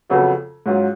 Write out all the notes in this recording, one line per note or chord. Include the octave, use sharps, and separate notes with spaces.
F2 C#3 F#3 B3 F#4
G#2 F#3 C#4 F4